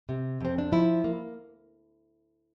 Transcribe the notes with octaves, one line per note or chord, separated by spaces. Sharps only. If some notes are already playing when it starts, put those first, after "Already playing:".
C3
F2 C4
D4
F3 E4
A#3